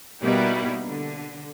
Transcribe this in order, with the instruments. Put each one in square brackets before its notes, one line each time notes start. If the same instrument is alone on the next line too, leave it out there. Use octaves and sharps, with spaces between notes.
[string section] B2 G3 A#3 D#4 E4
D3